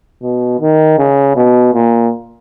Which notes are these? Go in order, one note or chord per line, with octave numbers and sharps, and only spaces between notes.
B2
D#3
C#3
B2
A#2